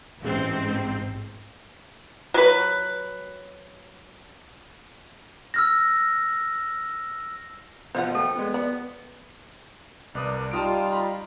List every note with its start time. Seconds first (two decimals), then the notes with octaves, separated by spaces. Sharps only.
0.19 A1 G#2 C4
2.34 F#3 B4
5.54 E6 F6 A#6
7.95 B2 F3 C5 F5 F#5
8.15 A3 A4 G5
8.36 G#3 B3
8.54 B3 D5
10.15 C2 A#4 B4 D5 D#6
10.51 G3 D#4 F4 A5 D#6 D7
10.92 A#5 B5